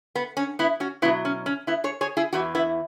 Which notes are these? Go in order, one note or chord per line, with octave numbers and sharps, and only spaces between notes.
B3
C#4
B3 E4
C#4 F#4
B2 F#3 B3 E4
C#4
C#4
B3 E4
G#4 C#5
G#4 C#5
E4 G#4
E2 E3 F#4
B3 E4